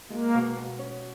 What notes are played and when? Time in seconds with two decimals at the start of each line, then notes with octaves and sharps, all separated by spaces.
0.10 G#3 A#3
0.34 B2
0.57 B2
0.79 C#4